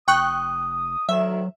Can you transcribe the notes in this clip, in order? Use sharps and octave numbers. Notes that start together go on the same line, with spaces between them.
F1 G5 C#6 D#6 F#6
D2 D#3 F#3 E5